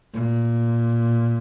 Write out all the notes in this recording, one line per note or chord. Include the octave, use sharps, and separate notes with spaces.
A#2